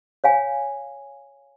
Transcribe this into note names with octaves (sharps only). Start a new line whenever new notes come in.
C#5 F5 G#5